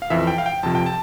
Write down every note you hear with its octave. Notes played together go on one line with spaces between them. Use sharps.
F5
F2 E3 E5
G5
F5
G5
F2 C3 F3 A5
G5
A5